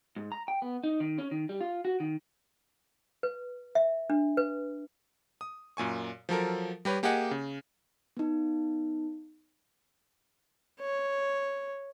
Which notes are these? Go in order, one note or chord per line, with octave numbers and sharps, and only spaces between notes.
G#2
A#5
G5
B3
D#4
D#3
C#4
D#3
G3
F4
F#4
D#3
B4
E5
D4
B4
D#6
F#2 A#2 G#5 C#6
F3 F#3 A4 A#4
G3 G4 B4 C#5
A#3 G4 G#4 D#5 F#5 G#5
C#3
B3 D#4
C#5